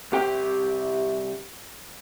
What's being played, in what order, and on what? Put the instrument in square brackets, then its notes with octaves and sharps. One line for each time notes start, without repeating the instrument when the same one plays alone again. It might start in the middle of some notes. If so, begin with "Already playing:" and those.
[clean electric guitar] C2 G4 G5